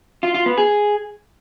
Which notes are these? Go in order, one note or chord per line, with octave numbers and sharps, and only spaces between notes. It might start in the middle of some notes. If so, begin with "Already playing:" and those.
F4
F4
B3
G#4